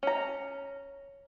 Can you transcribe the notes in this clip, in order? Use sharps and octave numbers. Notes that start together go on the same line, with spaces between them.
C#4 A#5